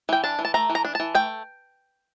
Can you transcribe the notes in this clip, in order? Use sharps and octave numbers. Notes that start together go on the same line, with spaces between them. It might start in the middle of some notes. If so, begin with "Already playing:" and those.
E3 G5
D4 A5
E3
A5
A3 A#5
E3
A#5
D4
E3 A5
A3 G5